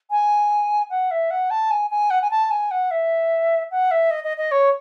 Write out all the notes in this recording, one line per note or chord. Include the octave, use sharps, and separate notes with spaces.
G#5
F#5
E5
F#5
A5
G#5
G#5
F#5
G#5
A5
G#5
F#5
E5
F#5
E5
D#5
D#5
D#5
C#5